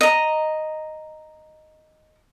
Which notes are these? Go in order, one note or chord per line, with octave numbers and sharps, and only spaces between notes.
D#5 A#5